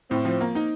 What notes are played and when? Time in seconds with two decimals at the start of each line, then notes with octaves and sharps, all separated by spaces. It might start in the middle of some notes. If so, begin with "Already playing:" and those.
0.10 A2 C4
0.25 F3
0.41 A#3
0.55 D#4